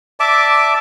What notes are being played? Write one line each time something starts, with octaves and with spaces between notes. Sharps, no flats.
D5 E5 A5 D6